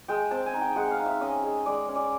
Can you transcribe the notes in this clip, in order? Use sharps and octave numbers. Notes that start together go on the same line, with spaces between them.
G#3 G5
C4 A5
G#5
D#4
G5
G#3 F#5
F5
D#4
E5
C#4 D#5
G#3
G#3 D5
C#4
D5